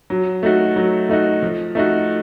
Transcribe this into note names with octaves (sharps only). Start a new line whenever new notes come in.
F#3
A3 D#4 F#4
F#3
A3 D#4 F#4
F3
A3 D#4 F#4